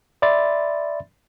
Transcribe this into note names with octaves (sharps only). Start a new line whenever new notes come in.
D5 E5 B5 C6 A6